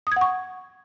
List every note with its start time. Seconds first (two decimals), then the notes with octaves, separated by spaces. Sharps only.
0.07 D#6
0.12 G#6
0.16 F#5
0.21 C#6